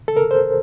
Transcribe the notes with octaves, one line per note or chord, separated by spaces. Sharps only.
A4
A#4
C5